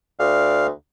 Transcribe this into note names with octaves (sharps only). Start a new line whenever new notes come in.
D2 D5 F5